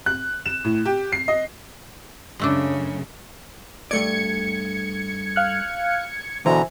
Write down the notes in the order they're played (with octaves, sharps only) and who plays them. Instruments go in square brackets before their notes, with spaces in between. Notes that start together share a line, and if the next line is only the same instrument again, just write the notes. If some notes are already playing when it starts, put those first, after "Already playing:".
[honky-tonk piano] F#6
E7
A2
G4
C7
D#5
[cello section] F#2 C#3 [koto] G#3 A3 D4
[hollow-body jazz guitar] G2 A3 D5 [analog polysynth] G#6 C#7
[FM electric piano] F5 F6 F#6
[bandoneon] B2 D3 A#5 [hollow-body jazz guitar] E3 [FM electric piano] C5 E5 G#5